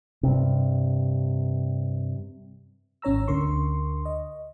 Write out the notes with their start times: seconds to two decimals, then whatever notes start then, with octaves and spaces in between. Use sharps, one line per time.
0.23 G2 C3
3.02 G#1 C#4 C#5 A#5 E6
3.28 D2 D3 A#4 C6 C#6
4.05 D#5